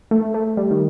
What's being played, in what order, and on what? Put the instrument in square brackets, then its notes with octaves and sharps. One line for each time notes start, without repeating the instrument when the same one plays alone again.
[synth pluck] A3
A3
G3
D#3